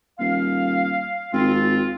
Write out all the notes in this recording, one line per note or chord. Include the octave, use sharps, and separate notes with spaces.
D#1 F5
G#1 C4 F4